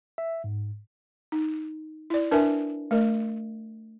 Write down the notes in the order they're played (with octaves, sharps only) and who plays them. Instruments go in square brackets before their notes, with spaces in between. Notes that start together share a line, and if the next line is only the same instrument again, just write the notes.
[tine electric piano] E5
G#2
[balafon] D#4
E4 D5
D4 A#4 B4 E5 G#5
A3 A#4 D#5